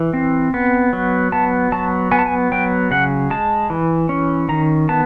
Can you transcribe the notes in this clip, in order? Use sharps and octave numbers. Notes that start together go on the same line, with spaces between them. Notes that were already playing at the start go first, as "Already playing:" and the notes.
Already playing: E3
C4
B3
F#3
B3 A5
F#3 A5
B3 G#5
A5
G#5
F#3 G5
C#3 F#5
G#3 A5
E3
C#4
D#3 A#5
B3 A5